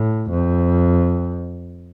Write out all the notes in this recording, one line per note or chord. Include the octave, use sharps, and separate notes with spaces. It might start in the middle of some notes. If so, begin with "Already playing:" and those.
Already playing: A2
F2